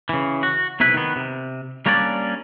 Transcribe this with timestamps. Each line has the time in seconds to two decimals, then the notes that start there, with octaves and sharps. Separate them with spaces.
0.09 C#3 E3
0.43 F#4
0.80 B1 C3 E4 B4
0.94 D#3 B3
1.16 C3
1.86 G3 A#3 C#4 D4 D5